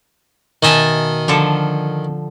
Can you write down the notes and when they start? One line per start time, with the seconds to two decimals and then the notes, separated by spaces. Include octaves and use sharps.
0.63 B2 D#3 D#5 E5 G#5 A5
1.28 D3 F3 A4